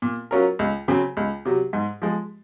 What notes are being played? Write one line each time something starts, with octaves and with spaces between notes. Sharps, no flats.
A#2
F#3 C#4 F4 A#4
C#2
C#3 F#3 C4
C#2
C3 F#3
G#2
F3 G#3